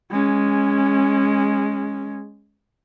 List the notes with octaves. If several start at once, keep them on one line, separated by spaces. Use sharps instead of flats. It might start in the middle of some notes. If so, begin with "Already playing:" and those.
G#3 C#4